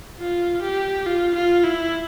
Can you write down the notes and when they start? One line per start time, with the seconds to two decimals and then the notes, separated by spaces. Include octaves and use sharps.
0.19 F4
0.62 G4
1.06 F4
1.35 F4
1.64 E4